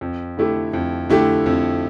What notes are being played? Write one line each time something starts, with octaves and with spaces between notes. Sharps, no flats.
F2
D3 A3 E4 G4
F2
D3 A3 E4 G4
F2